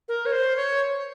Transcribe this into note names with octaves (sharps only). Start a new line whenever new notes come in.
A#4
C#5
C5
C#5